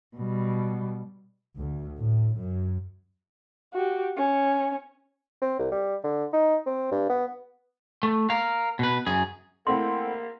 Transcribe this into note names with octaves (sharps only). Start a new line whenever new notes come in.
B2 G3
D2
A2
F#2
F#4 G4
C#4
C4
C2
G3
D3
D#4
C4
G2
B3
A3
A#4 F5
B2 B4
F#2 G#4
A3 A#3 C4 E4 F#5 C6